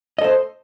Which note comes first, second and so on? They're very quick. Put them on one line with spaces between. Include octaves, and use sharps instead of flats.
D#5 A4 C5